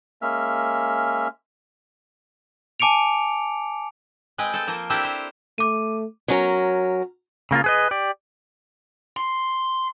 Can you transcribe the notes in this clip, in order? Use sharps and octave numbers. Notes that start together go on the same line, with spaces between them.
G#3 A#3 C#4 E5 F6
G#5 A5 D6 C#7 D7 F7
G#3 C4 B4 G5
A4 G5
F3 A#3
C4 D4 E4 G4 A4 A#4
C5
A3 D6 D#7
F#3 C#4 A#4
C#3 A#3 C4 F4
G#4 B4 D#5
G4 D5
C6